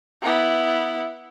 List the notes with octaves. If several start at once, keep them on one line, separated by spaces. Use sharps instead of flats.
B3 E4